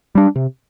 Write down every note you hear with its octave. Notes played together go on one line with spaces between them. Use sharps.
G3 D4
C3